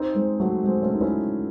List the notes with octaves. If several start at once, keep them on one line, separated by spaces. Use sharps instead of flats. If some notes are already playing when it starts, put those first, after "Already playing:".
Already playing: C4 D#4
G#3 C4
F#3 A3
G#3 C4
A3 C#4
D#4
C#4 E4